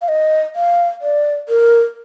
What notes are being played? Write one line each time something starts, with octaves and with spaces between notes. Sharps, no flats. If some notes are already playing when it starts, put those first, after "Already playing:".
F5
D#5
F5
D5
A#4